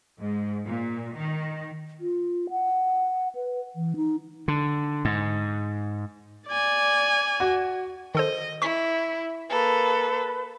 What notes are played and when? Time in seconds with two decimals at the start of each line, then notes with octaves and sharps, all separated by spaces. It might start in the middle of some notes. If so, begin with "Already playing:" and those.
0.19 G#2
0.65 A#2
1.16 D#3
2.00 F4
2.50 F#5
3.35 B4
3.76 E3
3.96 D#4
4.48 D3
5.05 G#2
6.47 D5 G#5
7.40 F#4
8.15 D#3 A4 C5 D#5
8.62 E4 C#6 B6
9.50 A#3 A4 B4